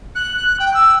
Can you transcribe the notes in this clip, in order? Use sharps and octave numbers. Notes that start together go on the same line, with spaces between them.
F#6
G5
E6